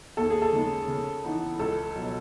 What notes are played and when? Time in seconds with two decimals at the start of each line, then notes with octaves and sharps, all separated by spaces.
0.17 D#2 A4
0.30 G#4
0.42 A4
0.53 C#3 G#3 D#4
0.88 C#3
1.24 E3 B3 D#4
1.59 C#2 A4
1.95 B2 F#3